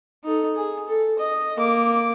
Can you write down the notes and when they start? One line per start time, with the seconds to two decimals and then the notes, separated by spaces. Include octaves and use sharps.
0.24 D#4 A4
0.56 G#4
0.88 A4
1.19 D#5
1.56 A#3 D6